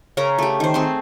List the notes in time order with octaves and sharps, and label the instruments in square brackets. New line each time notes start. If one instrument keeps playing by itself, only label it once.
[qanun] C#3 C#4 A#4 A#5
A3 G4
D#3 C5
A3 C4 G#4 C6